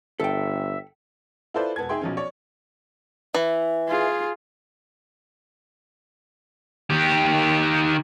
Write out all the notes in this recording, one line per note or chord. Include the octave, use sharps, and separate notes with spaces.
G1 A4 E5 G5
E4 F4 A4 B4 C5 D5
E1 B3 A5 G#6
D#4 G#4 E5 G5 C6
B1 F3 C#4
C#5 D5 C#6
E3 E5
F4 G#4
D#3 G4